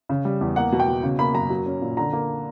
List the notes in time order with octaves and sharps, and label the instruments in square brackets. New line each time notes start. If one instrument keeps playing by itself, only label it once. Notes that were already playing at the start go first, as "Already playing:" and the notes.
[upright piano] C#3
G3
E2
A#3 F#5
B2
G5
B2
C#3
A#3 B5
F#2 A#5
F#3
C#4
A#2
D3 A#5
A#3